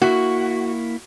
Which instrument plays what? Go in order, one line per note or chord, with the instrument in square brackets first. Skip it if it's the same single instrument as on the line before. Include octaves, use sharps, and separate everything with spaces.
[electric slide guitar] A#3 E4 [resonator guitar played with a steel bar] F#4